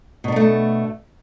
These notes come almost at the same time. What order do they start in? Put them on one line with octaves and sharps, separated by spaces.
B2 D4 B3 A3